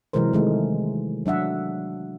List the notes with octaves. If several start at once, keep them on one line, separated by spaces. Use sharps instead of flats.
C3 E3 F#3 G#3 A#4 C5
D#3 G#3 A3
F#3 D4 E5 F#5